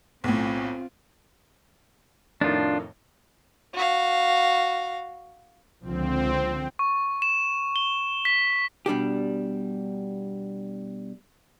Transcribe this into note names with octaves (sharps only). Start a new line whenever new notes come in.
B1 A2 C4 F4
F2 A2 D#3 D4 F4
F#4 F5
C#2 D3 F3 C4
C#6
E7
G7
B6
B2 G3 D4 G4